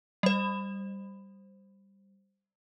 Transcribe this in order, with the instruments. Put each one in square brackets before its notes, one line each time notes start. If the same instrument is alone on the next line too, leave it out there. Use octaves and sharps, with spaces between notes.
[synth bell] G3 C5